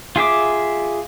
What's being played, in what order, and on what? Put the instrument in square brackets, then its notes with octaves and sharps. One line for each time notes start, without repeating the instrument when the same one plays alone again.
[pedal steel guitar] F4 G#4 E5 D6